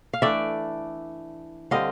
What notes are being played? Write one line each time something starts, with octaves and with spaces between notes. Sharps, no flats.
F5
E3 A3 D4 D5 E5
D3 G3 C4 D#5 F5